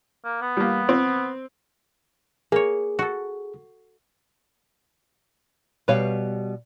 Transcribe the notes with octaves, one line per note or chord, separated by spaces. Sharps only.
A#3
B3
G3 A#3
C4
A#3 G#4 C#5
F#4 A4
B2 G3 B4 C#5 F5